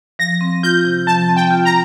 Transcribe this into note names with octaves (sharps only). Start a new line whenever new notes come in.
F3 A#6
C4
F4 G6
C3
F3 A5
C4
G5
F4
A#5